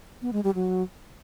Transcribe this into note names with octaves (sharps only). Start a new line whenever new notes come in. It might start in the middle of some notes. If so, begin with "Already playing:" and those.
B3
G#3
G3
F#3